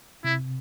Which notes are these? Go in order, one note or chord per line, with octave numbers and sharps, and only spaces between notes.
C3 E4